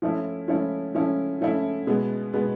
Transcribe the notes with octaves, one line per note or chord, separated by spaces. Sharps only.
F3 A3 C#4 E4
F3 A3 C#4 E4
F3 A3 C#4 E4
F3 A3 C#4 E4
B2 G#3 B3
B2 G#3 B3